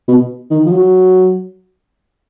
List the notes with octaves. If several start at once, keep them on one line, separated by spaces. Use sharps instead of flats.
B2
D#3
F3
F#3